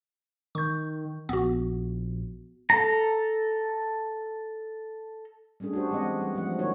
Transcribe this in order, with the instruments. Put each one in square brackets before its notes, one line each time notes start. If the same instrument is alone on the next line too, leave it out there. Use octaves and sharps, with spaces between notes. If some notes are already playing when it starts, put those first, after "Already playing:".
[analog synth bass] D#3 [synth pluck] C#6 G6
[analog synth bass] A#1 [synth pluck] B3 F#4
[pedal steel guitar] A4 A#5
[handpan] G3 A3 C#4 D4 G#4 A4
D4 F#4 G4 C5
E3 G#3 C4 D#5 F#5
G3
F3 A3 G4 F#5
D#3 A#3 D#4 F4 F#4 C#5